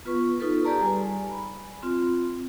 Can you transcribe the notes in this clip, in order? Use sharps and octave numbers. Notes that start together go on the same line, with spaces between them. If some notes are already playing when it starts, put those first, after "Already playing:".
B3 F4 B4 C#6
D#4 F4 A4 B4
G4 G#4 B4 D5 A5 A#5
G3 G#5
B5
C4 F4